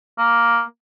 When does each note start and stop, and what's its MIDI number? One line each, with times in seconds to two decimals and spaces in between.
0.18 0.62 58